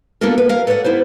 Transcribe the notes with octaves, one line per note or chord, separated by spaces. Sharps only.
A#3 B3 D4 F4 A4 A#4
B4
A#4 F5
A4 B4 C#5 D5 F#5
B3 E4 B4 C5